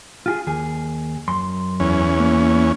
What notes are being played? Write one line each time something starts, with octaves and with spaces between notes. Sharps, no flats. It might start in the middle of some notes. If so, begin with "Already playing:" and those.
F4 G4 G#4
D#2 G#4
F#2 C6
E2 C#4
A#3